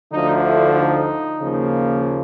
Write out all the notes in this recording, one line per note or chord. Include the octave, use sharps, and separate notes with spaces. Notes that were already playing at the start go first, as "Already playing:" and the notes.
D2 D3 F3 A3 D#4
E4
D#4
D#2 C#3 F3 A#3